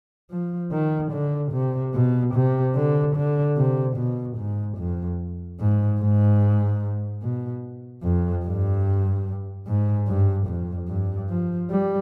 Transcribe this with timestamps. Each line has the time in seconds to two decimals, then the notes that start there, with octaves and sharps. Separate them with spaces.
0.30 F3
0.72 D#3
1.12 D3
1.52 C3
1.94 B2
2.35 C3
2.76 D3
3.16 D3
3.57 C3
3.97 B2
4.38 G#2
4.78 F2
5.60 G#2
6.00 G#2
7.22 B2
8.03 F2
8.45 G2
9.67 G#2
10.08 G2
10.47 F2
10.88 G2
11.30 F3
11.70 G3